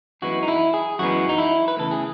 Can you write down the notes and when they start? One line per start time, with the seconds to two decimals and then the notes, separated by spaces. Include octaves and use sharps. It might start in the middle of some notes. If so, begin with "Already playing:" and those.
0.22 F#2 E3 G#3 B3 F#4
0.43 D#4
0.48 E4
0.74 G#4
0.99 F#2 E3 G#3 B3 F#4
1.29 D#4
1.38 E4
1.68 B4
1.77 E2 C#3 E3 A3 A4
1.91 G#4